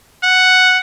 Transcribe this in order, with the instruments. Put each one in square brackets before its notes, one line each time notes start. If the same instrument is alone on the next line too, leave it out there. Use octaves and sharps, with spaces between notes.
[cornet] F#5